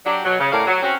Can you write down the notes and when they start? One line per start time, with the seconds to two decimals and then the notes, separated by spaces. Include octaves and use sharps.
0.05 F#3 D4 G4
0.25 B2 F#3
0.39 C#3
0.52 A2 A3 C#4 A#4 D5 F5
0.66 F#3
0.82 C4 C#4 F#4